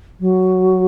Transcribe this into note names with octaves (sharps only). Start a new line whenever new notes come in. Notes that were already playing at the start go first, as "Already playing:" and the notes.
F#3